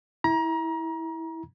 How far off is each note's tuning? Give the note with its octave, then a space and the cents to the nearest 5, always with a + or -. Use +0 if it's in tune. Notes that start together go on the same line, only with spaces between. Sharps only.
E4 -15 A#5 +30